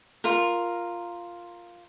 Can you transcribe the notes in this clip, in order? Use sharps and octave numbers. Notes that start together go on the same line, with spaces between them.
F4 A#4